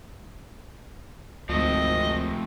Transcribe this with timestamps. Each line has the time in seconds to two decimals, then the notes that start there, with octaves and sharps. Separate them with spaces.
1.49 G#1 D2 F3 A3 C4 D#5